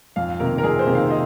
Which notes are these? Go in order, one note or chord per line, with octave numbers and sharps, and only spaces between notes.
F2 F5
C3 D#3 A#3 A#4
A#4
F2 G#4
C5
C3 D#3 A#3
F5
D#5